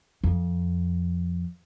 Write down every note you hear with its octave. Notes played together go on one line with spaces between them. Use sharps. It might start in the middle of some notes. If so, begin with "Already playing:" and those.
F2